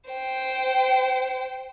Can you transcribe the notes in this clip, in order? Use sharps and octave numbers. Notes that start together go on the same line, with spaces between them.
C5 G5